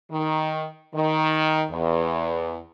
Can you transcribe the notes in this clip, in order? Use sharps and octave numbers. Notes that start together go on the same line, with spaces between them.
D#3
D#3
E2